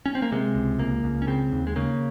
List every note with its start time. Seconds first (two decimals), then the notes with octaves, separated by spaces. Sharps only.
0.06 C#4
0.15 C4
0.22 A#3
0.32 C3 G#3
0.55 C#2
0.79 C#2 A#3
1.04 C#2
1.22 C#4
1.27 C#3 C4
1.52 D#2
1.67 G#3
1.76 C#3 A#3